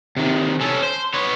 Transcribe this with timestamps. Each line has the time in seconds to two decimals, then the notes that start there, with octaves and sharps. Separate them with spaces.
0.17 C3 D#3
0.60 C#4 A4
0.83 C5
1.13 B3 C#5